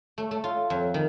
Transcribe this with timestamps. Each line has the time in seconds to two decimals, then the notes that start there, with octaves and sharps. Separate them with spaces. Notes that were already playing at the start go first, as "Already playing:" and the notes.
0.18 A3
0.31 A3
0.44 F4
0.70 F2
0.94 D#3